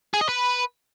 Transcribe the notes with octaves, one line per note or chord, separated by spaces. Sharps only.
G#4
D#5
B4